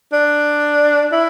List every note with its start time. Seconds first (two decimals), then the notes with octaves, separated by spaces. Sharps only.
0.13 D4
1.12 E4